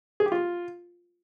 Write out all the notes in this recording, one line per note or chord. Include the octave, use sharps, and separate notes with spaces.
G#4
G4
F4